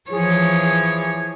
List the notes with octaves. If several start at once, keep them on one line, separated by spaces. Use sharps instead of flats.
E3 F3 G#4 C#5